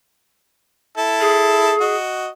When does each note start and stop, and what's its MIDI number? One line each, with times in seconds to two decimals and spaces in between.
0.98 1.74 64
0.98 1.74 69
1.21 1.95 68
1.81 2.29 66
1.81 2.29 75